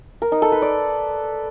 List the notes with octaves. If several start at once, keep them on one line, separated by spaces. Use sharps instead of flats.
A#4
D#4
A4
B4
D5